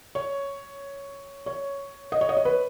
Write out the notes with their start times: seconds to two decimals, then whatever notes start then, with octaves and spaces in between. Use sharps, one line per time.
0.15 C#5
1.46 C#5
2.12 D#5
2.21 C#5
2.29 D#5
2.37 C#5
2.45 B4